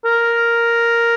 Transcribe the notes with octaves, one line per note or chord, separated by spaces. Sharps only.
A#4